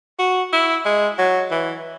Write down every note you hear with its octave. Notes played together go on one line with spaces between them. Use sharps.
F#4
E4
G#3
F#3
E3